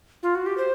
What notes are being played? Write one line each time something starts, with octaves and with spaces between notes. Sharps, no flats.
F4
F#4
G4
C5